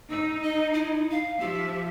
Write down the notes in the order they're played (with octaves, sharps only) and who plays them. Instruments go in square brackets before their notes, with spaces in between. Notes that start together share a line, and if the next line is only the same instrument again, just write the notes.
[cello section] D#4 [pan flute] E6
[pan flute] D#5
E4
F5
[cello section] F3 E5 [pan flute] G4